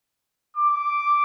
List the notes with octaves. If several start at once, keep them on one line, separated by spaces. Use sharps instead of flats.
D6